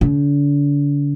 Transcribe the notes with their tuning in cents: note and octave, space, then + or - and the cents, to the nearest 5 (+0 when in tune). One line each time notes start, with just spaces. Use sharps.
D3 -40